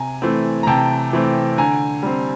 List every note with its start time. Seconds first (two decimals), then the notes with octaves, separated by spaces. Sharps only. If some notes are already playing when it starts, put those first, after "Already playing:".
Already playing: C3 G#5 A#5
0.22 E3 A3 C4
0.63 A#5
0.67 C3 G5 A5
1.13 E3 A3 C4
1.58 D3 G#5 A#5
2.03 G3 C4